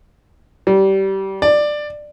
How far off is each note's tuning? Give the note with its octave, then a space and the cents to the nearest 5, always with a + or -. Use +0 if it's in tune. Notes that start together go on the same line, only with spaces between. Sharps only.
G3 -20
D5 +15